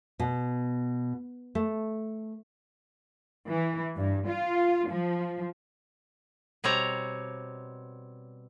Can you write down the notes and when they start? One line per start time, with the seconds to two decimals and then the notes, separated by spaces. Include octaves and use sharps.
0.20 B2
1.55 A3
3.48 E3
3.96 G2
4.28 F4
4.88 F3
6.64 B2 G3 C4 C#5 A#5